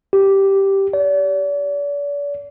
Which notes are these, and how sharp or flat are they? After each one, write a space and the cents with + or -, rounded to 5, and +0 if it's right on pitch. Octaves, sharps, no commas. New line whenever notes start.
G4 -5
D5 -40